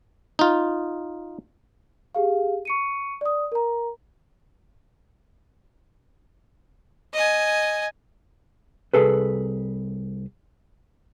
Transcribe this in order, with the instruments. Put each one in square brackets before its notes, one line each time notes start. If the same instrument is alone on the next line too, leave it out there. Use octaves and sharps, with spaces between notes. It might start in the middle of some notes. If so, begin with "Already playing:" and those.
[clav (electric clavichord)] D#4 F4
[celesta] G4 G#4 F5
C#6 C#7 D#7
D5 D#6
A#4 A#5
[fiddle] D#5 G#5
[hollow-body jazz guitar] C2 G#4 A4 B4